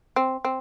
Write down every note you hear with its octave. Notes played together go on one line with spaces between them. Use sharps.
C4
C4